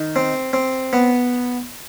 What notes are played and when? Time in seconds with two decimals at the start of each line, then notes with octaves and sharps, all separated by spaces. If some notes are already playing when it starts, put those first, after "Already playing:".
Already playing: D#3
0.16 C4
0.53 C4
0.93 B3